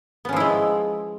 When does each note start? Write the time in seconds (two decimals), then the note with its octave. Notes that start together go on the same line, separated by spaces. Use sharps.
0.25 B3
0.29 C#4
0.33 F3
0.36 E4
0.40 G#3